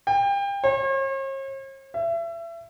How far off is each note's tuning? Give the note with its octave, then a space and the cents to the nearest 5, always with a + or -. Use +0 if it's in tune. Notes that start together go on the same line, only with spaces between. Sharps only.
G5 +30
C#5 -45
E5 +30